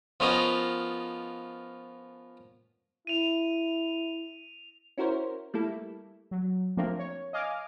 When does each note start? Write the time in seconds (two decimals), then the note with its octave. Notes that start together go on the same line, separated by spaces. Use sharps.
0.20 F3 B3 C#4 F4 A#4 D#5
3.07 E4 D#7 F7
4.98 C#4 E4 F#4 A#4 C5 C#5
5.54 G3 A3 A#3 E4 A4
6.31 F#3
6.77 F3 A3 A#3 C4 D4 A#4
6.99 C#5
7.33 D#5 F5 G#5 D6 F6